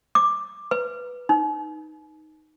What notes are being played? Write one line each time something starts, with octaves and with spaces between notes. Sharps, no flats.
D6
B4
D#4